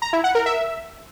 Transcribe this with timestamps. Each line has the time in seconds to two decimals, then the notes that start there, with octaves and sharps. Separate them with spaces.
0.02 A#5
0.13 E4
0.24 F#5
0.35 A#4
0.46 E5